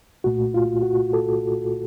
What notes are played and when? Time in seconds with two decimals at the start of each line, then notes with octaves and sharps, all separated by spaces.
0.24 C2 A#2 A3 F#4
0.54 F4
0.83 F#4
1.13 A4